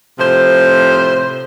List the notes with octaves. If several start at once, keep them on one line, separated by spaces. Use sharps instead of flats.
A2 C3 F3 C5